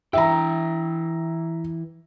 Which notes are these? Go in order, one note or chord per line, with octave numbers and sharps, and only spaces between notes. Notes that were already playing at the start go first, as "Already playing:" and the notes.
E3 E4 E5 G5 A#5